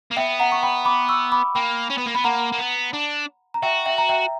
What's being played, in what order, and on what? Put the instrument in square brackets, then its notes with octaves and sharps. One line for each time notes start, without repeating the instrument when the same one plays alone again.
[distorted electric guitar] A#3
[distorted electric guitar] B3 [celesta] E5 G5
[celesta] F#5 A#5
C#6
G5 B5
B5 D6
C#6 E6
B5 D6
[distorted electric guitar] A#3 [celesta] G5 B5
[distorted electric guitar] C#4
B3
A#3
[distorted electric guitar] B3 [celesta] B5
[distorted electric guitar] A#3 [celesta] F#5 A#5
[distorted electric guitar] A#3
B3
D4
[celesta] A#5
[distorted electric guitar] F#4 [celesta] E5 G5
[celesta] E5 G5
A#5
E5 G5